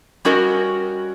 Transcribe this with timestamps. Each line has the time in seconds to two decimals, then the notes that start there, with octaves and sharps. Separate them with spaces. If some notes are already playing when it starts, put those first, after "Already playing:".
0.25 G3 C#4 F#4 A#4 D#5